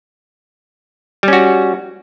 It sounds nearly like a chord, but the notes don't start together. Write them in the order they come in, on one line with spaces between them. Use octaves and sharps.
G3 C#4 F#4